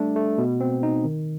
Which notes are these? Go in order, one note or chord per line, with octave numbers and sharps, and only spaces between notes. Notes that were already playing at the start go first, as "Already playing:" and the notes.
Already playing: G3 A3 D4
A3
B2
C4
D#4
D#3